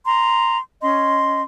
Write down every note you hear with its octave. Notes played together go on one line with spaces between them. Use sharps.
A#5 C6
C#4 D#5 C6